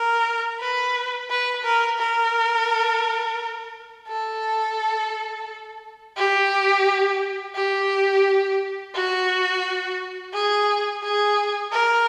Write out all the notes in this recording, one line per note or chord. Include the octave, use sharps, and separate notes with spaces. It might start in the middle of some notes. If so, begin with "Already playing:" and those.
Already playing: A#4
B4
B4
A#4
A#4
A4
G4
G4
F#4
G#4
G#4
A#4